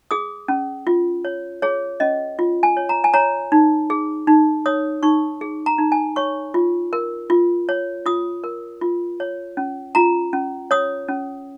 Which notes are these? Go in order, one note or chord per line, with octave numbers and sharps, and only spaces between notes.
G#4 D#6
C#4
F4
C#5
G#4 C#5
C#4 D#5
F4
G#5
C#5
A#5
G#5
C#5 A#5
D#4
G#4
D#4
C#5 D#6
D#4 C#6
G#4
A#5
D#4
G#5
C#5 C#6
F4
A#4
F4
C#5
F4 D#6
A#4
F4
C#5
C#4
F4 A#5
C#4
C#5 D#6
C#4